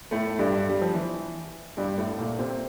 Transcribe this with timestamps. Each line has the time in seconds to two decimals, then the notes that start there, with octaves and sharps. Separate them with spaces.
0.11 A2 A3
0.39 G2 G3
0.69 G3
0.82 F3
0.94 E3
1.77 G2 G3
1.98 A2 A3
2.18 A#2 A#3
2.39 C3 C4